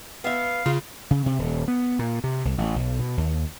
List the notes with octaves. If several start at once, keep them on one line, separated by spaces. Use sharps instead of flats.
B3 E5 F5
C#3 F4
C#3
C3
D#1
B3
A#2
C3
C2
A1
B1
B2
D#2